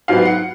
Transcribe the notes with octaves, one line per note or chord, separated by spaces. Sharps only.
G#2 F#3 B3 F5
F#5